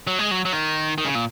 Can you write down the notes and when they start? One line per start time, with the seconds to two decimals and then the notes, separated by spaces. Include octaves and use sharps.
0.07 F#3
0.19 G#3
0.31 F#3
0.45 F#3
0.53 D#3
0.98 D#3
1.06 C#3
1.15 A#2